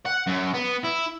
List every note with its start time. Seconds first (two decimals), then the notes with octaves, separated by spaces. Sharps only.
0.06 F#5
0.27 F#2
0.54 B3
0.84 E4